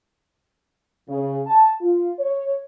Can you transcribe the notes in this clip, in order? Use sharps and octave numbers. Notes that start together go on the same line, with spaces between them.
C#3
A5
F4
C#5